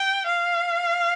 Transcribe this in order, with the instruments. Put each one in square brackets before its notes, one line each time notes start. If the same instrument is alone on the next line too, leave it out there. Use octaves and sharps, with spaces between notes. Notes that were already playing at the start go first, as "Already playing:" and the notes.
Already playing: [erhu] G5
F5